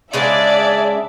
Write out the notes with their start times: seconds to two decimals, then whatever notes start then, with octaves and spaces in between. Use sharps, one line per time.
0.13 C#3 G#3 D4 G#4 D5 E5